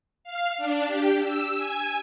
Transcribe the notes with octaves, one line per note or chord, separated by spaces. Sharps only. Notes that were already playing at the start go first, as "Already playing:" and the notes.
F5
D4
G4
E6
G#5